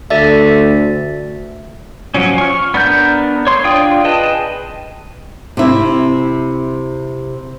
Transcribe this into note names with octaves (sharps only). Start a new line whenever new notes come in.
D2 A4 D5 E5
F3 F#3 C#4
C#6 F6
B3 D4 A#4 G6
C#5 C6
D4 F4 D5 G5 D#6
G#4 B4 D#5 G5 A5
C3 E4